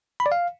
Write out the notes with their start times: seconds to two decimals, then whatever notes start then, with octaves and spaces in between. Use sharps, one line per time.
0.20 B5
0.26 D5
0.32 F5